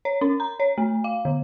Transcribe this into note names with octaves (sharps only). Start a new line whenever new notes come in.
C#5
C#4
A#5
C#5
A3
F5
D3